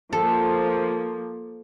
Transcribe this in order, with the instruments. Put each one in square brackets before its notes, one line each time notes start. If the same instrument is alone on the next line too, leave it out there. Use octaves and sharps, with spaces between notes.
[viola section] F3 A#3 [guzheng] A4